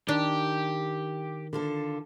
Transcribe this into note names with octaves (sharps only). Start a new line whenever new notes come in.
D#3 D4 G4
D3 F4 A4